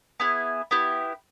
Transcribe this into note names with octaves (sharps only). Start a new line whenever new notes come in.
B3 E4 G#4
B3 E4 G4